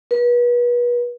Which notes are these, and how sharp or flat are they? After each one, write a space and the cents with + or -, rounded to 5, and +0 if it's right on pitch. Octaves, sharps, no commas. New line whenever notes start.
B4 -35